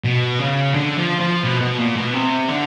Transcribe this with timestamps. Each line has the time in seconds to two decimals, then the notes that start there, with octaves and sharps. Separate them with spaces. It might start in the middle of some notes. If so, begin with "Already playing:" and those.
0.04 B2
0.39 C#3
0.74 D3
0.98 F3
1.21 F3
1.44 B2
1.61 B2
1.78 A#2
1.97 B2
2.14 C3
2.49 D3